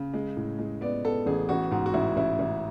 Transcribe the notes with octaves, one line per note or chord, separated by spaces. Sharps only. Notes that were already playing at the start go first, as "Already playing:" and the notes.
Already playing: C#3
G#3
A2
G#3
B3 D5
B3 A4
A1 G#4
A1 F#4
G#2 F#4
F#4
A1 E4
A1 E4
A1